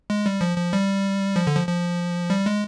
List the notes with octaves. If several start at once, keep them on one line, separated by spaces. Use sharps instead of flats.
G#3
G3
F3
F3
G3
F3
D3
F3
F3
G3
G#3